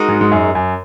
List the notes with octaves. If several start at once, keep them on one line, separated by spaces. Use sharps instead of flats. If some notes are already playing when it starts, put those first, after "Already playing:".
Already playing: G#3 D#4 F#4 A#4
G#2
G#2
F#2
F#2